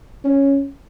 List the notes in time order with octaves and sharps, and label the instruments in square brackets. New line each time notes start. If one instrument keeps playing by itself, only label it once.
[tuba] C#4